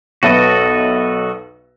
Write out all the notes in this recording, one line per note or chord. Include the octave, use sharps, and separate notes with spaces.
B1 F#4 A4 B4 D#5 E5